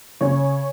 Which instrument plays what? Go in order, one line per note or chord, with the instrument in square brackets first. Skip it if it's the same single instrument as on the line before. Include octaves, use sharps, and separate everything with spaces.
[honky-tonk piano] C#3 C#5